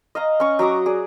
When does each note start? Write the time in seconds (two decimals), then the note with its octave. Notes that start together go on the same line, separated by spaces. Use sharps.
0.15 D#5 F5 A#5
0.40 C#4 C#6
0.59 F#3 A#5 D6 D#6
0.86 G#4 D5